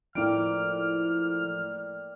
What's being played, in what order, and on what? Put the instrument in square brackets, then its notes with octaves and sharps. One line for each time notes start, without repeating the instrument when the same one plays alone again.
[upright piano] A2 D7 [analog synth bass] F3 [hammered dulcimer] A#3 D5 G5 [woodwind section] F6